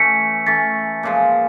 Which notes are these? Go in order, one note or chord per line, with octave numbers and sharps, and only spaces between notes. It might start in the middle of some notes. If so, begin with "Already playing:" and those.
Already playing: E3 A3 C#4 B6 C#7
E3 A3 C#4 A6 B6
A#2 F3 G#3